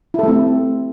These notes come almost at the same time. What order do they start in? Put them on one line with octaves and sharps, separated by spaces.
E4 A4 A3 C4